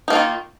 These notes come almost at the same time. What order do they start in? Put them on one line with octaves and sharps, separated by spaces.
D#4 A#3 F4 D#3